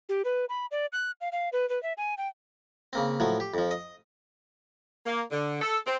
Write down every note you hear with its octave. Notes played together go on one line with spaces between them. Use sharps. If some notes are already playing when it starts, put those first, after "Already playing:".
G4
B4
B5
D5
F#6
F5
F5
B4
B4
E5
G#5
G5
C#3 A#3 C4
A2 F3 F#3
G4
F2 F3
D#5
A#3
D3
A4
C4